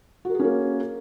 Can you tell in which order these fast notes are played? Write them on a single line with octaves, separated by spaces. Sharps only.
F#4 A#4 G#4 C#4 A#3